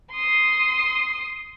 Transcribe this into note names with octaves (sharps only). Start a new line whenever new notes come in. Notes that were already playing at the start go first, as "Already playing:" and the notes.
C6 D#6